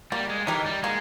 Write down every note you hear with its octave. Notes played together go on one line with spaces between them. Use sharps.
G3 A#3
G#3
E3 D#4 G4 A#4
G3
G#3 A#3